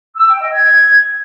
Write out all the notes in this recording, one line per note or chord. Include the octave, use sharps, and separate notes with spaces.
E6
G5
D#5
G#6